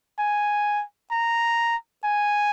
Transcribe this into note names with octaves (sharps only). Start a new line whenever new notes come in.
G#5
A#5
G#5